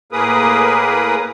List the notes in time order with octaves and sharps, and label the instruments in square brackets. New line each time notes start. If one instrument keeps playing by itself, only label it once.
[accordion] A2 A#3 G#4 A#4 B4 D#6